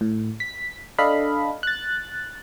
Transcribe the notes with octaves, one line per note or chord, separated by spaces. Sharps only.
A2
B6
D4 A4 D#5 F5 B5
F#6 A6